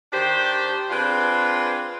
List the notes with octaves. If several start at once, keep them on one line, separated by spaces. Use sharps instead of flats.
D#3 D4 G4 C5
C4 D4 F4 G#4 B4